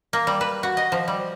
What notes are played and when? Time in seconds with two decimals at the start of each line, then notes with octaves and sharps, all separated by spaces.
0.13 A#3
0.27 G3
0.41 B4
0.63 F#4
0.77 D#5
0.92 F3
1.08 G3